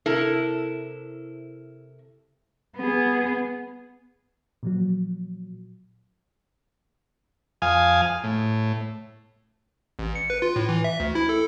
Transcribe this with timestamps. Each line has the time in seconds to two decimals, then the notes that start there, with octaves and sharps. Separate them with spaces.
0.06 C3 E4 A4 A#4
2.77 B3 G#4
4.63 A#2 F3 F#3
7.62 F2 F5 G#5 D#6
8.24 A2
9.99 A1
10.15 C#7
10.30 B4
10.42 F4
10.56 A2
10.69 E3
10.84 E5
11.00 D2
11.15 E4
11.29 A4